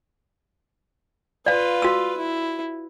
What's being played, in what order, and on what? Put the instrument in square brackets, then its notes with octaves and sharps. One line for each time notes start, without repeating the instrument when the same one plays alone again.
[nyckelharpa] F4 B4 [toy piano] D5 F5
[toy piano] F#4 E6
[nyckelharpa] E4